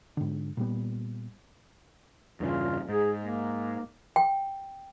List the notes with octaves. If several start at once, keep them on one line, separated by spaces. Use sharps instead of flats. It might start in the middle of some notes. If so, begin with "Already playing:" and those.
G#2 D3
A#2 G3 B3
E2 G2 C#3 F4
G#2 G#4
A#3
G5